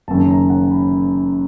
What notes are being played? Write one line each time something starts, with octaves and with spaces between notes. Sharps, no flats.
F#1 F#2 D#3 A5
A#5
F#5
B5